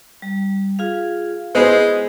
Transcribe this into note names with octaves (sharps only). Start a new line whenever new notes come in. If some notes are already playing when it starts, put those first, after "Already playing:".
G3
F4 G#4 F5
G#3 B3 E4 G#4 C5